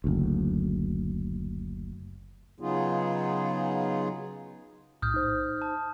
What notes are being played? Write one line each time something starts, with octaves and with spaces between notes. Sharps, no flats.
F#1 D2
C#3 F#3 B3 D#4 F4 G#4
B1 A2 D#6 F6 G6
D#4 C5
A5